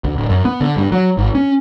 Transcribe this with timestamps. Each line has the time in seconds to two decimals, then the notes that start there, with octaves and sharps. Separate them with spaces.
0.04 D2
0.16 D1
0.29 F#2
0.45 B3
0.60 D3
0.76 G2
0.92 F#3
1.17 G#1
1.35 C#4